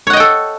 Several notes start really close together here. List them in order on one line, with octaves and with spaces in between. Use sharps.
C#5 F#5 D#5 G5 A4